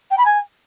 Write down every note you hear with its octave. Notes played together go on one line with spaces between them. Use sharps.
G5
B5
G#5